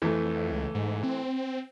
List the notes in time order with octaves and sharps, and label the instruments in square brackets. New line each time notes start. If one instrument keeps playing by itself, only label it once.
[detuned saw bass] F2 [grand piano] E3 A3
[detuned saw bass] C#2
G#2
C4